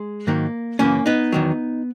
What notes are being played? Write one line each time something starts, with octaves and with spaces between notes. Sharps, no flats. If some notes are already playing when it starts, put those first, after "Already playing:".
Already playing: G#3
G#2 D#3 F#3 A#3
F#2 C#3 E3 A#3 C#4
B3 D#4
E2 D#3 F#3